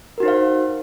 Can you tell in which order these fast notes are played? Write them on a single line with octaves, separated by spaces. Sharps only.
A#4 F#4 D#4 C5 F5